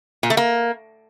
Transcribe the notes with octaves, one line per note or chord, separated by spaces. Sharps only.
A#2
A3
A#3